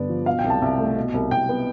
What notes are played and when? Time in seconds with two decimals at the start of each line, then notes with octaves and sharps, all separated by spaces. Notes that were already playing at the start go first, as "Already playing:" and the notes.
Already playing: G2 D3 B3 D5
0.09 F3
0.26 B2 F5
0.39 G5
0.44 C2
0.50 A5
0.62 C2
0.79 A3
0.96 B2
1.14 C2
1.31 C2 G5
1.49 B3